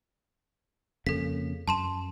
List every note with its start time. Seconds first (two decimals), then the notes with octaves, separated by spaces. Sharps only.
1.07 F2 C#3 A#3 A4 B6
1.68 F#2 A5 C6 E7